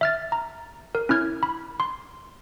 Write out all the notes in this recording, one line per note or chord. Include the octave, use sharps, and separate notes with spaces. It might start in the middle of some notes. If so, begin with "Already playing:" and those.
E5 F6 A6
A#5
A#4
C#4 E4 F6 G#6
B5
C6